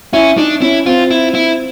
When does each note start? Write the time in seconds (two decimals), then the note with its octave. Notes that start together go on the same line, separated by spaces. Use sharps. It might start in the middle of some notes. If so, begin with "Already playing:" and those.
0.13 C#4 E4
0.37 D4 D#4
0.61 C#4 E4
0.86 C4 F4
1.11 E4
1.35 E4